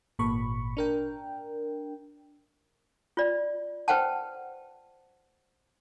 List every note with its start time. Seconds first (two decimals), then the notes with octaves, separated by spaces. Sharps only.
0.19 G#1 A#2 B5 C#6
0.77 D4 A#4 G5
3.17 F4 D5
3.88 B4 C5 F#5 G5 A5